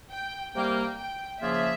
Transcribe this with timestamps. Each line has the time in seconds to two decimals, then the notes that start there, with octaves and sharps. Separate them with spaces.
0.10 G5
0.53 C3 G3 A#3 G5
0.97 G5
1.40 C#3 F3 A#3 F4 G#4 E5